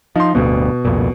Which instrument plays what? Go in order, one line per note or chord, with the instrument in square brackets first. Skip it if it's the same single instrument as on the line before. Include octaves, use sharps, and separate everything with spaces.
[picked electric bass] F3 [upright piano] D#4 C6
[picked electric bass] D1 D2 G2 [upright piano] B2
[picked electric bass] C2 F2 A#2